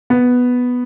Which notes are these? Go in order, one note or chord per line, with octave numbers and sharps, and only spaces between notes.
B3